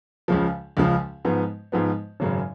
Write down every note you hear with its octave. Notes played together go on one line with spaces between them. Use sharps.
C#2 C#3 F3
C#2 C#3 F3
G#2 F3 B3
G#2 F3 B3
G#1 F#2 C#3